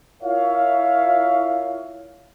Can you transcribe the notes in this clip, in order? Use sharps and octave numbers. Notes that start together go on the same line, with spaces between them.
E4 F4 A#4 C#5 E5 F5